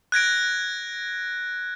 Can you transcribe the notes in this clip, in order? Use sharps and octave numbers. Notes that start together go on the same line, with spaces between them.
F#6 G#6 A#6 D7